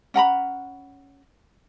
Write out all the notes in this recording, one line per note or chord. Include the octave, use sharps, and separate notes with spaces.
C#4 F#5 A#5 B5